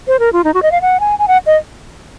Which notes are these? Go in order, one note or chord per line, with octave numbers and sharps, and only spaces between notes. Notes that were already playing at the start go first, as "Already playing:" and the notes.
C5
A#4
F4
D#4
F#4
D#5
F5
F#5
G#5
G#5
F#5
D#5